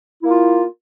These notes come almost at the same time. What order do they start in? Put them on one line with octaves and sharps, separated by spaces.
E4 A#3 F4